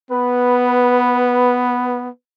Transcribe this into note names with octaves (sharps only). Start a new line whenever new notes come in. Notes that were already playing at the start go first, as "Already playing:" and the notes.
B3 B4